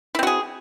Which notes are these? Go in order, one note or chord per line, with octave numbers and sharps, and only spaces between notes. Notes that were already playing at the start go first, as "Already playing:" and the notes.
C4 E4 F#4 G#4